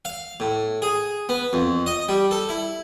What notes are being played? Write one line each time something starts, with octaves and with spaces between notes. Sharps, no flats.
F5
A2
G#4
B3
F2
D#5
G3
A4
E4